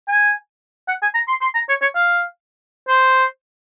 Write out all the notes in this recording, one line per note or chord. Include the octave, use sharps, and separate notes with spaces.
G#5
F#5
G#5
A#5
C6
C6
A#5
C#5
C#5
F5
C5